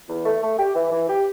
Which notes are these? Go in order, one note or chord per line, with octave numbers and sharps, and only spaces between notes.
E2
A3
A3
G4
E3
E3
G4